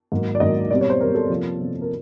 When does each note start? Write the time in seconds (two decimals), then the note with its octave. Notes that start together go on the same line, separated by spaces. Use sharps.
0.12 G#2 D#3 F#3 A#3
0.35 D5
0.40 G#2 D#3 F#3 A#3 D#5
0.70 B2 G3 C4 D5
0.81 C#5
0.90 C5
1.00 B2 G3 C4 A#4
1.15 A4
1.30 C3 F3 A#3
1.59 C3 F3 A#3
1.81 A#4